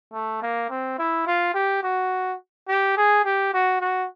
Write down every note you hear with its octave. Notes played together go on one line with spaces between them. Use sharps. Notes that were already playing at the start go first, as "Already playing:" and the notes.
A3
A#3
C4
E4
F4
G4
F#4
G4
G#4
G4
F#4
F#4